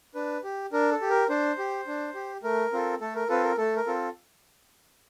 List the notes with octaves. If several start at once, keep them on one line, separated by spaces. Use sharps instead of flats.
D4 B4
G4
D4 A#4
A4
G4
A#4
D4 C5
G4
D4
G4
A3 A#4
C4 F4 A4
A3 A4
A#4
C4 F4 A4 B4
A#4
A3 A4
A#4
C4 F4 A4